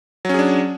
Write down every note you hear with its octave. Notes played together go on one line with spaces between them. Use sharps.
F#3 C#4 D4 G#4